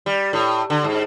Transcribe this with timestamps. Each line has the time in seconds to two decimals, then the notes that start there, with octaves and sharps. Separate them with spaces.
0.06 G3
0.33 A2
0.70 D3
0.84 G#2